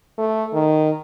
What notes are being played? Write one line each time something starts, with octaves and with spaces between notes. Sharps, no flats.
A3
D#3